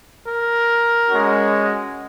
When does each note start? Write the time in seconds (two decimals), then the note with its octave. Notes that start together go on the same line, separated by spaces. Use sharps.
0.27 A#4
1.09 G#3 C#4 F#4